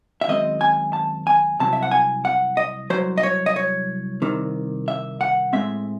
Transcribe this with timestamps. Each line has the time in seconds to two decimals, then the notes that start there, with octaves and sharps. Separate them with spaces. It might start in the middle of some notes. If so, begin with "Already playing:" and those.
0.21 E5
0.28 F#2 D#3 G#3 C4 D#5
0.61 G#5
0.93 A5
1.27 G#5
1.59 C2 C3 F#3 C4 A5
1.73 E5
1.83 F#5
1.91 G#5
2.25 F#5
2.57 D#5
2.90 C2 C3 F#3 C5
3.18 D#5
3.23 C#5
3.46 D#5
3.56 C#5
4.22 C2 C3 D#3
4.88 E5
5.21 F#5
5.53 A2 G#3 C4 E5